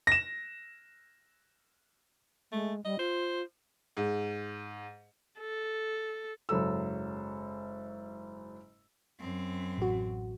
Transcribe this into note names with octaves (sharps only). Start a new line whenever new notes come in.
A#6 E7
G#3 A3
G3 D#5
F4 C5
G#2
A4
F#1 G#2 F#3 A4 E6
F#2 C4
A1 F#4